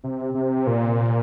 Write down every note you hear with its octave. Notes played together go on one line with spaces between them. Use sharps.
C3
C3
A#2